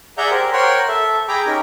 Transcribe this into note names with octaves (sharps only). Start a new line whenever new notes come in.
G#4 D5 E5 F#5 A#5 G6
G4 A#4 C5
A#4 C5 C#5 F#5 G5 C6
A4 E5
G#4 G5 A#5 B5 D6
C#4 D#4 G4 A#4